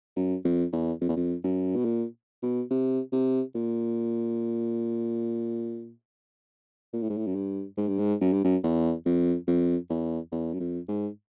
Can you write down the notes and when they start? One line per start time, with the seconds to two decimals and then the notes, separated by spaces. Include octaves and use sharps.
0.16 F#2
0.45 F2
0.73 E2
1.01 F2
1.09 E2
1.16 F2
1.44 F#2
1.76 B2
1.85 A#2
2.43 B2
2.71 C3
3.12 C3
3.55 A#2
6.93 A#2
7.02 A2
7.10 G#2
7.17 A2
7.27 F#2
7.35 G2
7.77 G#2
7.88 G2
7.99 G#2
8.21 F#2
8.33 G2
8.44 F#2
8.63 E2
9.06 F2
9.47 F2
9.90 E2
10.32 E2
10.54 F#2
10.60 F2
10.88 G#2